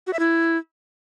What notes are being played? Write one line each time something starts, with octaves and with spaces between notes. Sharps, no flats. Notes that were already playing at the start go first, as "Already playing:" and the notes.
F#4
E5
E4